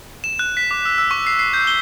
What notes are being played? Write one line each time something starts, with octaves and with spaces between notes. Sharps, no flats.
E7
F#6
B6
D6
E6
E6
C#6
C7
C7
G6
G7